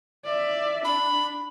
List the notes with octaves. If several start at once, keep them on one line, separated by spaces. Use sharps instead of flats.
D5 E5
D4 B5